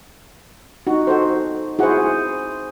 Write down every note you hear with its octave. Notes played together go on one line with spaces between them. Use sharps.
D#4 F#4
F#4 A4 C5
E4 F#4 G#4 C5 F#5